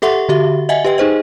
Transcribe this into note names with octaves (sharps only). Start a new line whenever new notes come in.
G4 A4 E5 F#5 C6 C#6
D3 F#4 G4 E5
D#5 E5 F#5 G#5
G4 B4 D#5 G5
D#4 G#4 C5 D#5